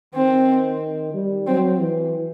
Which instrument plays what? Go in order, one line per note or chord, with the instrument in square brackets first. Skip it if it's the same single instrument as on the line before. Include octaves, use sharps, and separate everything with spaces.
[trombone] D#3 [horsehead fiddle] C4
[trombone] G3
[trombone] F#3 [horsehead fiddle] C4
[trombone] E3